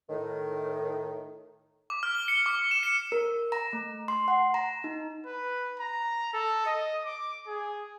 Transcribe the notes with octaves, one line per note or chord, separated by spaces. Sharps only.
A2 D#3
D6
F6
G7
C#7
D6
E7
C#7
A#4
A#5
A3
C6
F#5
A#5
D#4
B4
A#5
A4
D#5
D6
G#4